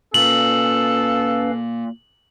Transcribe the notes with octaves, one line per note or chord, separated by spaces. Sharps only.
A#2 C#4 A4 B4 F5 F#7